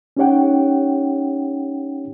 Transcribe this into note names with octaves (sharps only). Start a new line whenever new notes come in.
C#4 D#4 G4 C#5 F#5 G5